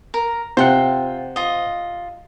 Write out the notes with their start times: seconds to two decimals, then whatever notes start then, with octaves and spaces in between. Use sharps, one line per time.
0.14 A#4
0.57 C3 F4 C5 F#5 G5
1.36 F4 D#5